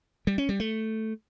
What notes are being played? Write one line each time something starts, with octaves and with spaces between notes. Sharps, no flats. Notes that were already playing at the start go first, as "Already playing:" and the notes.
G3
C#4
G3
A3